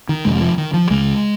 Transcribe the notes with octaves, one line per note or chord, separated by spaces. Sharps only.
D#3
F1 F2 C3 G#3
F3
D#3
F3
C#2 C#3 G#3